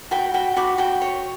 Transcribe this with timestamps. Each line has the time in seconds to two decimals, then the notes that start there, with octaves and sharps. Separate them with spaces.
0.11 F#4 G5 B5
0.34 F#4 G5 B5
0.56 F#4 B5 D6
0.78 F#4 G5 B5
1.01 C#5